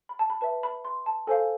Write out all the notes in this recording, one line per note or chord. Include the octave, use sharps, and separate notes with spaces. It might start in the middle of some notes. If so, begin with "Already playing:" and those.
B5
A5
B5
B4 E5 A5
B5
C6
A5
A4 C5 F5 G#5